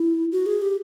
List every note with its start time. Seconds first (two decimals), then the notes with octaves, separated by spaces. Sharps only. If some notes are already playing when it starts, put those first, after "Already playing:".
Already playing: E4
0.32 F#4
0.46 G#4
0.62 G4